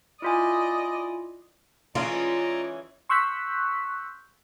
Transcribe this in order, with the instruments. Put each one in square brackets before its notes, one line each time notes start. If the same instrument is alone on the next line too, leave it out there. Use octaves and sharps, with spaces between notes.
[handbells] E4 F4 G#5 [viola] D5 D#5
[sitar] E3 G#3 C#4 [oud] F4 [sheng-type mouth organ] D5 D#5 A#5
[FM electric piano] C6 C#6 E6 F#6 G6 B6